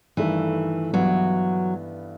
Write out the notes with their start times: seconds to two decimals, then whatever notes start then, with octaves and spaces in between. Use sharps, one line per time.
0.17 G2 D#3 E3 A3
0.93 G2 E3 F#3 B3